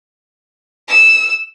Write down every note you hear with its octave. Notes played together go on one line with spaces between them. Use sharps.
E6